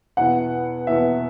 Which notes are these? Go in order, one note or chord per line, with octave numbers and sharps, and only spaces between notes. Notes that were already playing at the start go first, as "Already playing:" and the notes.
E2 B2 B3 E4 F#5
E2 B2 B3 E4 E5